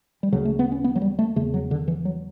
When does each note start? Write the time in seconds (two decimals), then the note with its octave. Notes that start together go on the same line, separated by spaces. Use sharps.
0.23 G3
0.32 D2 C#3 F#3
0.45 A3
0.59 B3
0.72 C#4
0.84 B3
0.96 F#3
1.02 G3
1.19 A3
1.36 E2 C#3 A3
1.54 F#3
1.71 D3
1.88 E3
2.05 F#3